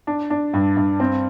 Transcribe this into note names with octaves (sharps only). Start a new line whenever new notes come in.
D4
D4
G2
G2
C4